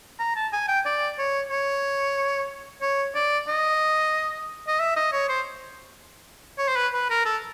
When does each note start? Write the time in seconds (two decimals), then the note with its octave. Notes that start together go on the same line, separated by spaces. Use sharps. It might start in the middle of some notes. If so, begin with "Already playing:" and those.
0.19 A#5
0.36 A5
0.52 G#5
0.68 G5
0.85 D5
1.18 C#5
1.51 C#5
2.81 C#5
3.15 D5
3.48 D#5
4.67 D#5
4.79 E5
4.96 D#5
5.13 C#5
5.29 C5
6.58 C#5
6.67 C5
6.76 B4
6.93 B4
7.10 A#4
7.25 A4